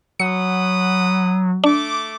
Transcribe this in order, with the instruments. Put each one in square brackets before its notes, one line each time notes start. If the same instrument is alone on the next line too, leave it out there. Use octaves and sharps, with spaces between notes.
[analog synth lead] F#3 [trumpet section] F#5 B5 D#6 [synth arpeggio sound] C#7
[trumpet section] A3 D6 [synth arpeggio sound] D4